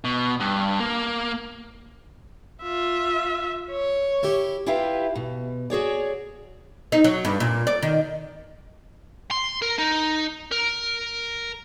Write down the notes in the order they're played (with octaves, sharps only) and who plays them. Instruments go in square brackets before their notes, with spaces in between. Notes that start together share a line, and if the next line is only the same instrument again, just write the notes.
[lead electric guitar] B2
G2
A#3
[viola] F4 E5
C#5
[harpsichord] E4 G4
[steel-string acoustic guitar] E4 F4 G4 B4 E5 F5
B2
F#4 G#4 C#5 D5
[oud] D#4
F#3
G2
A#2
D5
D#3
[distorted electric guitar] C6
A#4
D#4
A#4